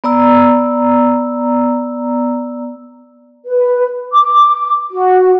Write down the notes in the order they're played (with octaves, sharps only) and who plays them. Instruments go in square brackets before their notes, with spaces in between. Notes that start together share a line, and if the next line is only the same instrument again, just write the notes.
[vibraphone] B3 D5 A#5 E6
[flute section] B4
D6
F#4